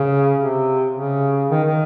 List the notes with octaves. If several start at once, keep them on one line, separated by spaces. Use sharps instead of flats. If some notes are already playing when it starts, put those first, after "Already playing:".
Already playing: C#3
C3
C#3
D#3
D#3